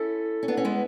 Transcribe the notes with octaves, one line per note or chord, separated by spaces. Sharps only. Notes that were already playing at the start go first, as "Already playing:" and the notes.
Already playing: C#4 E4 A4
C#4
B3 D4
C#4
G#3 B3